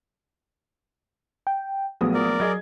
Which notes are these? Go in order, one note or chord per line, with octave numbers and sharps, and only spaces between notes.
G5
A#1 F#3 A3 B3 G#4 D#6
A#4 D5
F#3 G#4 D#5 G#6